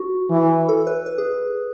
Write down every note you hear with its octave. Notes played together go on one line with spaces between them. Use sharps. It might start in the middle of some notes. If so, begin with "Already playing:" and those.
Already playing: F#4
E3
A4
B4
B4
G#4